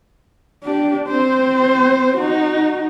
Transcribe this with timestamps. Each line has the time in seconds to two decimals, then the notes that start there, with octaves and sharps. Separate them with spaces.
0.63 D4 G4
1.07 C4 C5
2.17 D#4 F#4